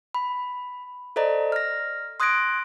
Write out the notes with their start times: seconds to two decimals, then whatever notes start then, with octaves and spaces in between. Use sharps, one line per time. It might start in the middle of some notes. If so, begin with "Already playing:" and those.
0.14 B5
1.16 A4 C5 D5 D#5 A#5
1.52 F6 A#6
2.20 C6 D#6 F#6 G#6 A#6 D7